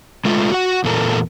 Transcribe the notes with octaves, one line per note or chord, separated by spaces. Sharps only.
G#3 A3 F4
F#4 F#5
E2 A#2 A4 A#4